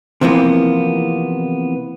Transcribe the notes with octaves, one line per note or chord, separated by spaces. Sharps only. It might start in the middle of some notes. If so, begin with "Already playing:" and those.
C3 E3 F3 A#3 B3